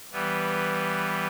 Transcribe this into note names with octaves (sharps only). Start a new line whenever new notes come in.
E3 G3 B3